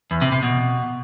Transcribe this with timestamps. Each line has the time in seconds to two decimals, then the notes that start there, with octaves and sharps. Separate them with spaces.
0.11 E2
0.22 C3
0.32 C3
0.43 B2